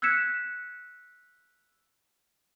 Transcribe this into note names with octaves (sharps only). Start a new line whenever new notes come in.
E6 F#6 G#6 B6 C#7 E7